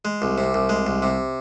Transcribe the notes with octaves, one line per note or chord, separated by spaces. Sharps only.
G#3
C2
C3
C2
G#3
C2
C3